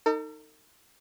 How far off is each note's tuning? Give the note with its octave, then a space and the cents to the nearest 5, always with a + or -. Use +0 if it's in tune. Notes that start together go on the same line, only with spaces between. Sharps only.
D#4 +0 A4 +45